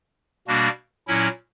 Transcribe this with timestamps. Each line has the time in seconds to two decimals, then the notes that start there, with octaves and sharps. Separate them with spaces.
0.48 B2 G3 A#3 D4 F#4
1.07 A#2 F#3 C#4 E4